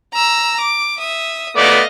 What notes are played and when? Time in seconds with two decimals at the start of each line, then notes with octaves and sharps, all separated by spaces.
0.14 A#5 E6
0.61 D6
0.99 E5 D#6
1.57 A3 B3 D5 D#5 F5